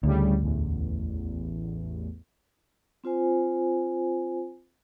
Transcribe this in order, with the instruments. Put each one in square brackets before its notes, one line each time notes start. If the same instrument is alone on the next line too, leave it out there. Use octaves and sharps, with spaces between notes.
[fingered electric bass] D2 [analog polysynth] A2 C#3 G3
[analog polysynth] A1 E2
[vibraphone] C4 F4 C5 G#5